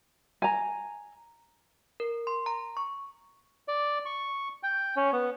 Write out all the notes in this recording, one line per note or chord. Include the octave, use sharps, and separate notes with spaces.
G#5 A#5
A#4
C6
A#5
C#6
D5
C#6
G5
C#4
B3